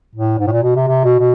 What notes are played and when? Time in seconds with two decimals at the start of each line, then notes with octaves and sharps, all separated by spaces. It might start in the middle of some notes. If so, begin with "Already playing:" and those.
0.15 A2
0.39 G#2
0.47 A2
0.51 A#2
0.63 B2
0.75 C3
0.88 C3
1.04 B2
1.19 B2